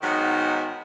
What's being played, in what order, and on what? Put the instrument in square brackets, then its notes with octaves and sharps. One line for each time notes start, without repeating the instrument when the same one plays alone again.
[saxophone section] G#2 D#3 F#3 B3